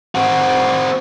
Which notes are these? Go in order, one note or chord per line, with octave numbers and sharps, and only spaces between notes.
C4 F#4